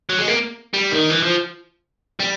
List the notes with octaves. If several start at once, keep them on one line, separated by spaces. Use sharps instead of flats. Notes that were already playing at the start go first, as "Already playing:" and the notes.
F#3
G#3
A#3
G3
D#3
E3
F3
G3